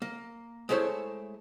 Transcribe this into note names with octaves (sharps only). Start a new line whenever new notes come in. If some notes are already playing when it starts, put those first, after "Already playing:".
A#3
G#3 A3 E4 C5 C#5